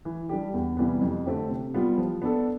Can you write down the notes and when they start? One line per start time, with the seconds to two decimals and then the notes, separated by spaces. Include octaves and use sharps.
0.05 E3
0.29 G3 D4 G4
0.54 E2
0.77 C3 E3 G3 B3
1.01 F2
1.26 D3 A3 C4 G4
1.50 C3
1.74 G3 B3 F4
1.98 F3
2.22 B3 D4 A4